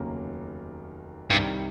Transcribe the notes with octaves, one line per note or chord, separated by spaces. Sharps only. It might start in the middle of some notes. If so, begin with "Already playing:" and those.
Already playing: F1 D#2 C#3 F#3 A#3
C2 G2 C3 D#3 G3